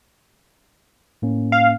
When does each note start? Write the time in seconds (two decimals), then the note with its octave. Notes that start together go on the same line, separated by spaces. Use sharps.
1.22 A2 A#3 C#4
1.52 F5